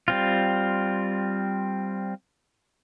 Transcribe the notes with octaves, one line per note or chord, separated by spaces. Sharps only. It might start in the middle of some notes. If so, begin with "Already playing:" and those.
G3 C4 F4